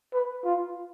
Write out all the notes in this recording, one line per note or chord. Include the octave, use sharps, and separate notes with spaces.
B4
F4